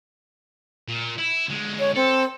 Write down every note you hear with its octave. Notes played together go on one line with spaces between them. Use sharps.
A#2
E4
D3 G#3
C#5
C4 A4